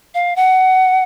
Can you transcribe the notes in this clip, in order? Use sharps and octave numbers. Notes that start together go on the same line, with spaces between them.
F5
F#5